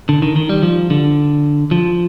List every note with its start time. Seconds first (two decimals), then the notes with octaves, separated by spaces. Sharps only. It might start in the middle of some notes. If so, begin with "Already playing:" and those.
0.09 D3
0.22 D#3
0.36 D#3
0.49 G3
0.63 F3
0.90 D3
1.71 F3